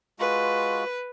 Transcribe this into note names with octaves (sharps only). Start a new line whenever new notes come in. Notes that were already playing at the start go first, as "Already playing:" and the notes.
G#3 F4 F#4 B4